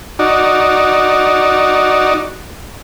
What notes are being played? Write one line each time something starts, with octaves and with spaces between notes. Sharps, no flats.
D#4 F#4 D5